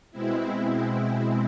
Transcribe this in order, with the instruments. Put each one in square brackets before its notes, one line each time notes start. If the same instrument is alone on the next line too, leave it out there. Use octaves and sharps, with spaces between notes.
[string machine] B2 G#3 C4 E4